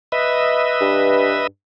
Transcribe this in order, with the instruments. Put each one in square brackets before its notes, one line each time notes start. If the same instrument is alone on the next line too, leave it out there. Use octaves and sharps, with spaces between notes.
[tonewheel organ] B4 D#5 E5
[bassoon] G2